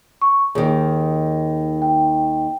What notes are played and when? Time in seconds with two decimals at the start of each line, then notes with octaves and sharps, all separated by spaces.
0.22 C#6
0.55 D#2 D#3 G#4
1.82 G5